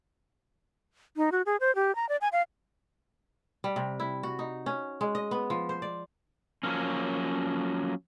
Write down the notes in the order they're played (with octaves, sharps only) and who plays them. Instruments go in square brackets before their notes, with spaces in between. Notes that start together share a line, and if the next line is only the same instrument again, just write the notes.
[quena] D#4
F#4
G#4
C5
G4
A#5
D5
G#5
F5
[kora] G3
C3
E4
F#4
D#4
C#4
G#3
D#5
B3
F3
C5
D5
[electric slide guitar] F3 F#3 A#3 C#4